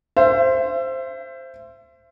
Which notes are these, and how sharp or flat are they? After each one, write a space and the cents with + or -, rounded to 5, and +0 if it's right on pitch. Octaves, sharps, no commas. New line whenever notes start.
C5 +0 E5 +30